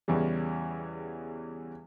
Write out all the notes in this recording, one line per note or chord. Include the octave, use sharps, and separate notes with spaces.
E2 C#3 E3 G3